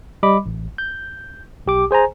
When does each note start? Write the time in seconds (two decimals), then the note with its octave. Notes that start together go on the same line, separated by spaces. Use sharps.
0.23 G3 D#5 B5 D6
0.46 A1
0.78 G6
1.66 B1 G4 D6
1.91 G#4 C5 G#5 A#5